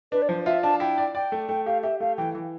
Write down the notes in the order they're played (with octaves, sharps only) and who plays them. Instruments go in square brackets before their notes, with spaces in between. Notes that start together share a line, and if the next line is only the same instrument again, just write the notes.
[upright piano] D4 [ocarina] B4
[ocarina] D5
[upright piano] F3 [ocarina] C5
[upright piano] F4 [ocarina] E5
[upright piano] D4 [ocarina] A5
[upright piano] E4 [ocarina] G5
[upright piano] D5
[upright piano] D5 [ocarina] G5
[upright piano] A3
[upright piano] A3 [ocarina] G5
[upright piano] G4 [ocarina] F5
[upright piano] G4 [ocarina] E5
[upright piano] A3 [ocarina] F5
[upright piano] E3 [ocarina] G5
[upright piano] E3